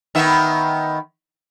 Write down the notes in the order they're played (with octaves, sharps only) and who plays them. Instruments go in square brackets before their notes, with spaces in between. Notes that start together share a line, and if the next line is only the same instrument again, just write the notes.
[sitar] D#3 B3 E5